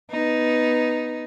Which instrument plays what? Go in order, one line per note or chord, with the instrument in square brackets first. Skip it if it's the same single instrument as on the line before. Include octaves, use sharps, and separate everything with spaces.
[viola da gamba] B3 D#4